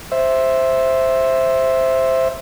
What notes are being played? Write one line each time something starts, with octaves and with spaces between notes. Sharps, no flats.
C5 E5